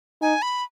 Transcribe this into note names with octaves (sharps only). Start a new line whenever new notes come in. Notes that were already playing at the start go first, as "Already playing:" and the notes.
D#4 G#5
B5